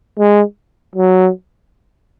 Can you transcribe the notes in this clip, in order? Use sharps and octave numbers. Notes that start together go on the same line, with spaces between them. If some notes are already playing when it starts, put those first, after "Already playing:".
G#3
F#3